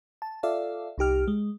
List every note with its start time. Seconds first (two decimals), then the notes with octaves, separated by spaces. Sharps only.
0.22 A5
0.43 F4 A4 D5 E5 F5
0.98 C2 D#4 G4 F6
1.28 G#3